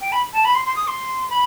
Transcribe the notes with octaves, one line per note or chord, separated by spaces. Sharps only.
G5
B5
A5
B5
C6
C6
D#6
C6
B5